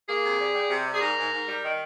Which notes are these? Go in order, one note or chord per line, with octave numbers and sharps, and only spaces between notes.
A#3 G#4
C3
G3
G3
C3
G3
G#4
G#2 A#4
G#2
G#2
G3
D#3